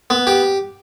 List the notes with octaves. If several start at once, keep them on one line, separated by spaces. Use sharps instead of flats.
B3
G4